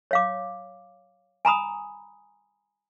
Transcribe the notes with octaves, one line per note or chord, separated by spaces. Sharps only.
C#5 F5 D6
G#5 A#5 B5 D#6